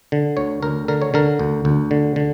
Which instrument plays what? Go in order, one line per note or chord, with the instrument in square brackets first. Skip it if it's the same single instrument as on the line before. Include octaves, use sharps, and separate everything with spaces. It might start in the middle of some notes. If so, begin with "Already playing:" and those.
[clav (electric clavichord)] D3
D2 C#5
D2 A#4
D3 A#4
C#5
D3 A#4
D2
D2
D3
D3